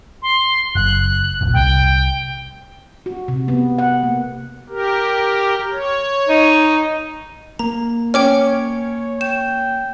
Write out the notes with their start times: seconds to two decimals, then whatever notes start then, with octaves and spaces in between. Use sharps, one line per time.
0.22 C6
0.76 F#1 F#6
1.41 F1 A#1
1.54 C2 G5
3.06 F#4
3.28 C3
3.48 B3
3.79 F#5
4.03 A#3
4.69 G4 A#4
5.72 C#5
6.28 D#4
7.59 A#3 A#5
8.14 C#4 G5 D6 F6
8.46 C#5
9.21 G5 E7